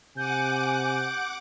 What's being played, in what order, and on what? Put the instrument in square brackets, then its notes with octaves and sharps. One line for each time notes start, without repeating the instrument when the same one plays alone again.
[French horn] C3 [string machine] F#5 D6 [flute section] G#5 [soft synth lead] G6